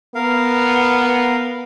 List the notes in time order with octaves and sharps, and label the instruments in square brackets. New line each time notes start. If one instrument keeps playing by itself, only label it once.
[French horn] B3 [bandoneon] A#4 F5